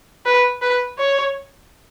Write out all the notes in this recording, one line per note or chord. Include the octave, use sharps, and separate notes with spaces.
B4
B4
C#5